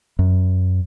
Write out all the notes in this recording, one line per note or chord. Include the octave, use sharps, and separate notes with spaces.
F#2